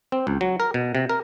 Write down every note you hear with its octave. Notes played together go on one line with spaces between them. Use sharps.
C4
C#2
F#3
A#4
B2
C3
A#4